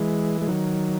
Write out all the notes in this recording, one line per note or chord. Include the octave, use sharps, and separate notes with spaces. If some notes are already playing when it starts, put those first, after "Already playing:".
Already playing: E3 G#3
G#3
D#3 F#3